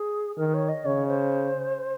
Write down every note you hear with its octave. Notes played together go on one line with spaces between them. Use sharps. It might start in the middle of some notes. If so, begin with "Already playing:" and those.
Already playing: G#4
D#3 A#4
C#5
D#5
C#3 C#5
C5